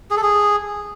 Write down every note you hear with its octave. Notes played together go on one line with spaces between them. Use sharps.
G#4
A4
G#4